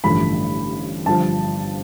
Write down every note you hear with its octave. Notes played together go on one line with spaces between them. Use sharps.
A1 G2 D3 F3 A3 B5
G1 G2 F3 A5